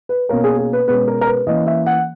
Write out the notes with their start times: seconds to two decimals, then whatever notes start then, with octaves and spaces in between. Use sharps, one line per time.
0.09 B4
0.29 B2 A#3 C#4 A#4
0.44 G#4
0.58 G#4
0.73 B4
0.88 B2 G#3 C#4 B4
1.08 A#4
1.21 A#4
1.27 B4
1.47 E3 A#3 C#4 D#5
1.67 E5
1.86 F#5